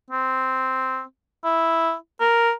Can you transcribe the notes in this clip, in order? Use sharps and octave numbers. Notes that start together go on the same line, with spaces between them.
C4
E4
A#4